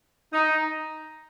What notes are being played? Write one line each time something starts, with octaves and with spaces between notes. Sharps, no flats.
D#4